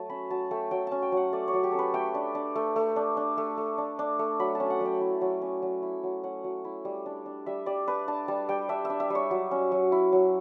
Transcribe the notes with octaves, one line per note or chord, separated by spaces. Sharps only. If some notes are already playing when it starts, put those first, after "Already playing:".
Already playing: F#3 A3 A5
C#4 B5
F#3 A5
A3 G5
F#3 G5
C#4 A5
G5
F#3 F#5
A3 D5
C#5
F#3
G4
C#4 A4
B4
A3 G5
D4
D4
A3
A3
D4
D4
A3
A3
D4
D4
A3
F#3 B5
A5
C#4
F#5
F#3
G5
E4
F#3
C#4
F#3
E4
F#3
C#4 F#5
F#3
E4
G3
D4
D4
G3 E5
G3 D5
D4 B4
D4 A5
G3 A5
G3 G5
D4 E5
D4 E5
E5
G3 C#5
F#3
C#4
F#3
E4
F#3